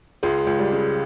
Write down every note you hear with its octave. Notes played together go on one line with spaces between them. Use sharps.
C#2 G#3
C#2
G3
C#3